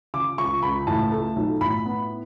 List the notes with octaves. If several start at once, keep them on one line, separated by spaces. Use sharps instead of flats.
C#3 D6
C#2 C#6
C#2 B5
A2 A5
A3
B1
A2 B5
B3